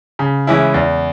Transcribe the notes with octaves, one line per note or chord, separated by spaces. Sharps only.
C#3
E3 G#3 C#4 E4
E2